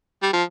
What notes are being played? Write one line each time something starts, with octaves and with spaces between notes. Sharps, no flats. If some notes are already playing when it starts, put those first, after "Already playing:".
G3
F3